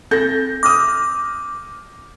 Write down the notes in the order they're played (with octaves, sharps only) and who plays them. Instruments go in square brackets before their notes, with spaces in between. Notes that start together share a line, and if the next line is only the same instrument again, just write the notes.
[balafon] C4 [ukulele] A4 [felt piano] G6 A#6
[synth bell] D6 [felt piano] D#6 F6 A#6